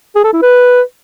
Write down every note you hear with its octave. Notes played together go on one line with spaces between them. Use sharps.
G#4
A4
E4
B4